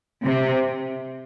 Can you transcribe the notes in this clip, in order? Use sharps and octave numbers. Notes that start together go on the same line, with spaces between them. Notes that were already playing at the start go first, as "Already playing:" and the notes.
C3